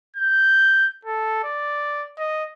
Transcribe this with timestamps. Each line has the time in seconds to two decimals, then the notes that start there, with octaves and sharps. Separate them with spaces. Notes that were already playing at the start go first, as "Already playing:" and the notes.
0.16 G6
1.05 A4
1.43 D5
2.18 D#5